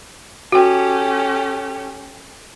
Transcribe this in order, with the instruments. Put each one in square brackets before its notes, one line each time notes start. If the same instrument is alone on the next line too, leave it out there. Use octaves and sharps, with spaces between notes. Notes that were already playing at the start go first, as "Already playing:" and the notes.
[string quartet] C#4 G4 A4 [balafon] F#4 G5